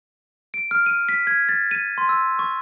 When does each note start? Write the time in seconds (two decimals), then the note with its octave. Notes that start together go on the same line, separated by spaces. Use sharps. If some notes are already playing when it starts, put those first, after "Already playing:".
0.54 D7
0.71 F6
0.86 D#7
1.09 B6
1.27 G#6
1.49 A6
1.71 D#7
1.98 C6
2.09 E6
2.39 C#6